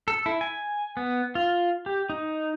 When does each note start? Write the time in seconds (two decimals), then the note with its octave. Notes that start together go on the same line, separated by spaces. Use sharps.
0.08 A4
0.26 E4
0.41 G#5
0.97 B3
1.35 F4
1.86 G4
2.10 D#4